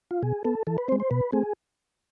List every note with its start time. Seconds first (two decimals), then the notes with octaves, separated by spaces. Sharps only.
0.11 F4
0.23 B2 G#4
0.44 B3 A4
0.67 E3 A4
0.78 B4
0.88 C4 C5
0.92 G#3
1.00 C5
1.11 B2 B4
1.32 A3 C4 G#4